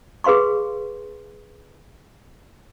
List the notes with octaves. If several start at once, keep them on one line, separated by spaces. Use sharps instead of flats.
G#4 B4 F5 C6 C#6